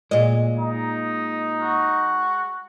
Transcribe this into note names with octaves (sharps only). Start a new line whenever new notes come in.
A#2 G#3 D#5
D#4
F#4